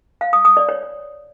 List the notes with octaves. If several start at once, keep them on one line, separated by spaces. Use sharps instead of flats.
F5
D#6
D#6
D5
C#5